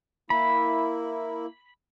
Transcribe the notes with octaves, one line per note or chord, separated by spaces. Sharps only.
A#3 E4 B5